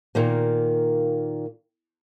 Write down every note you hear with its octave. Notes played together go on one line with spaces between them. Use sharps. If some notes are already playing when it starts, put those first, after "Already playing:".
A#2 D#3 A#3